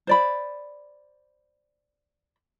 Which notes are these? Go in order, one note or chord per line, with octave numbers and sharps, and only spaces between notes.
C5 D5 B5